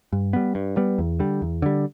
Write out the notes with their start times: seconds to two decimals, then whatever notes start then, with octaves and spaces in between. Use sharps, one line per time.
0.13 G2
0.33 G3 B3
0.55 G2
0.77 G3 B3
0.98 E2
1.19 D3 G3
1.42 E2
1.62 D3 G3